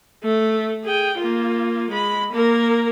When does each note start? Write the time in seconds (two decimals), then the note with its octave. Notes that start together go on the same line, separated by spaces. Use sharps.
0.24 A3
0.84 G#4 G5
1.18 A#3 F4
1.91 G#3 B5
2.32 A#3 A#4